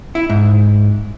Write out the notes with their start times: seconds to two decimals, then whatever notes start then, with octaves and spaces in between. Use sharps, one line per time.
0.15 E4
0.30 G#2